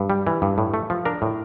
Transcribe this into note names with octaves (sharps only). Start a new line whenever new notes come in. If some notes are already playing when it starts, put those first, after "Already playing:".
Already playing: G2
G3
E3
G2
A2
A3
F3
D4 A#4
A2